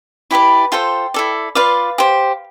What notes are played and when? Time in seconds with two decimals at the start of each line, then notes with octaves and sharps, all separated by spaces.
0.31 E4 G4 B4 D5 B5
0.72 F4 A4 C5 G5
1.14 E4 A4 D5
1.55 F4 B4 D5 F5
1.98 G4 C5